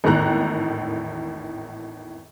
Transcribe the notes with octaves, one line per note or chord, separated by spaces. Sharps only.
G#1 E2 A2 D#3 A#5 F#6